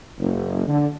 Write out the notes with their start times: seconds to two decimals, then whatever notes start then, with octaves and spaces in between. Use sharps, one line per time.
0.19 F#1
0.67 D3